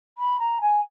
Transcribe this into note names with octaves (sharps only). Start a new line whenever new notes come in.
B5
A#5
G#5